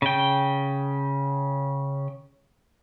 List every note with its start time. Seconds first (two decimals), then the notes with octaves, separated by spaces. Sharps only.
0.02 C#3 G5